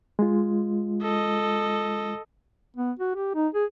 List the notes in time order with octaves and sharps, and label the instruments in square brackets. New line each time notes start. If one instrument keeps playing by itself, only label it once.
[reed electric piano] G#3 F4
[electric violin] A4 D#5
[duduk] B3
F#4
G4
D#4
G#4